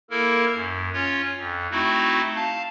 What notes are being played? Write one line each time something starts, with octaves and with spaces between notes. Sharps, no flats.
A#3 E4 A4 A#4
F#2
C#4 F4 C#5
F2
A3 C4 D#4 E4 F#4
F5 A5